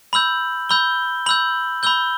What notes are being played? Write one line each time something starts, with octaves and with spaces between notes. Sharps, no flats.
B5 E6 G6 F#7
B5 E6 G6 G7
B5 E6 G6 F#7
B5 E6 G6 G7